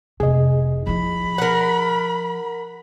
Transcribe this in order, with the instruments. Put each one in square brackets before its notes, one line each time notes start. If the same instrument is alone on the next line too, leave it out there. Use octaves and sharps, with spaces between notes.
[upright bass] F1 C3 [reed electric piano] G#4 D#5
[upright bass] F3 E4 [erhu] B5
[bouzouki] A#4 F#5